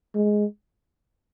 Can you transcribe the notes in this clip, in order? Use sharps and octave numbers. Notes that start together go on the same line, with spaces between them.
G#3